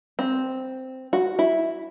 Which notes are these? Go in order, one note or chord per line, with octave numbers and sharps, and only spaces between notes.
C4
F#4
E4